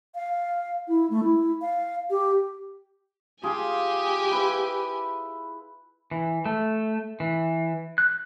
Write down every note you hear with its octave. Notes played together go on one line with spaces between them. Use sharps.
F5
E4
A3
E4
F5
G4
F4 G4 G#4 F5 G#5
E4 B4 E5
E3
A3
E3
F#6